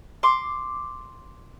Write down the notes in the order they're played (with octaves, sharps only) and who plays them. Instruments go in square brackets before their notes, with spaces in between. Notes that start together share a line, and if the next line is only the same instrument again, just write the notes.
[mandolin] C6 D6